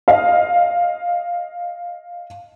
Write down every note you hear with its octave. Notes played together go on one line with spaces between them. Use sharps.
D#5 F5